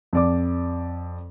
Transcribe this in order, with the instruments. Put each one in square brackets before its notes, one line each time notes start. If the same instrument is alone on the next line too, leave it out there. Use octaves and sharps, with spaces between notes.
[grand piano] F2 D5 D6